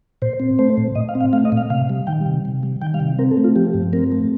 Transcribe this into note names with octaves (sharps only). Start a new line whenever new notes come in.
A#2 C5
C4
A3 C5
A#2
A#2 D#5
F5
C4
F5
A3 F5
D#5
A#2
F5
C3 F5
G3
D#3 G5
C3
C3
G3
D#3 G5
F5
C3
C4 A#4
A4
A3
F4
F3 G4
G2
C4 A#4
A3